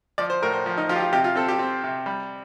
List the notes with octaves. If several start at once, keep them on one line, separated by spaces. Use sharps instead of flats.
F3 D5
C5
A2 A#4
C5
F3
D#4
F3 F4
G4
F4
C3 G4
F4
C4 A4
G4
C4
C3
G3